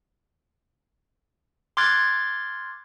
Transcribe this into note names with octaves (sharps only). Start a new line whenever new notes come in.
C6 D6 F6 F#6 G#6 A6